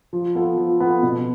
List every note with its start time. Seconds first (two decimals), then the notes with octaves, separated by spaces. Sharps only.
0.13 F3
0.35 B3 F4 A4
0.58 F3
0.80 B3 F4 A4
1.03 B2